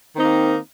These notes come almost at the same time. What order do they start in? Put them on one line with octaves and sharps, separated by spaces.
D#3 C4 D#4 A#3